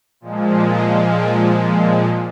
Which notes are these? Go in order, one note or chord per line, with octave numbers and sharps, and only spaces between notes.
A#2 F3 G#3
D#5
A#4